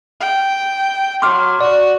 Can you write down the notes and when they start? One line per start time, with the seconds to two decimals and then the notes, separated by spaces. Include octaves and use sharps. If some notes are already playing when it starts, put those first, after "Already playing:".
0.20 G5
1.22 F#3 C6 D6 F6
1.61 F#4 D5